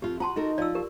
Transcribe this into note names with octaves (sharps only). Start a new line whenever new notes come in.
F2 F4 G4
F4 F#4 F#5 A5 C6
D#4 F#4 A4 A#4
F3 D5 E6
G4 A#4